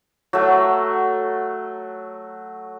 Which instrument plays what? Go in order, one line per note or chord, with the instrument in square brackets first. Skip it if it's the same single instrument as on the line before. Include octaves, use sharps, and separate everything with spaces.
[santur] F#3 A3